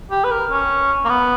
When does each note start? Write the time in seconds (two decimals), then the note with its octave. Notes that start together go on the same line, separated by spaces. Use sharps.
0.11 G4
0.24 B4
0.31 A#4
0.51 C#4
1.05 A#3
1.09 B3